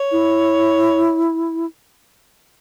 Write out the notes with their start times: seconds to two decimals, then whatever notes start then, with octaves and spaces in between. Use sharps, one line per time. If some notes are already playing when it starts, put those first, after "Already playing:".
Already playing: C#5
0.12 E4